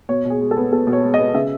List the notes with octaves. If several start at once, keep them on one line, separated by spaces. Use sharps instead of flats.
B2 C#5
B2
G#4
G#3
A4
B3
B2 A4
B2
C#5
G#3
D#5
B3
C#3 E5